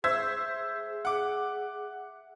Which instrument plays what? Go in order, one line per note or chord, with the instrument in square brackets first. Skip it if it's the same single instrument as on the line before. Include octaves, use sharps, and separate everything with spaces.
[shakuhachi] G#4 [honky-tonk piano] C5 E6 G#6 [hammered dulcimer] E5
[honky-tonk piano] F#5 D6